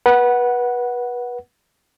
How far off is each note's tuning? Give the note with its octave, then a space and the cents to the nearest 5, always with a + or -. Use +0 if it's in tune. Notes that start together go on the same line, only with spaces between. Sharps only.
B4 -25 F#5 +0